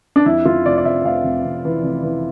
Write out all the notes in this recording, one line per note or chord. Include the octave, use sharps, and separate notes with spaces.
D4
F2 E4
F2 F4
F1 D5
D5
F1 E5
F1 F5
F1
F1
E3
F1
E3